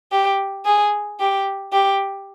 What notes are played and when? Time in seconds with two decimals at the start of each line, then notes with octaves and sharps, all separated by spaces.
0.12 G4
0.65 G#4
1.20 G4
1.73 G4